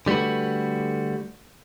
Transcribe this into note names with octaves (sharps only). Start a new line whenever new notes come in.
D3 G3 A3 F#4 B4